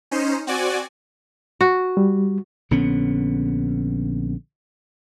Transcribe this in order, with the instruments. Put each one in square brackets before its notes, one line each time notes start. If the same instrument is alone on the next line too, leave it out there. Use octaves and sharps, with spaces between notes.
[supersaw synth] C#4 D#4 C5
C4 F#4 D5 G#5
[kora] F#4
[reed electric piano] G3
[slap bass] A#1 D3 B3 C#4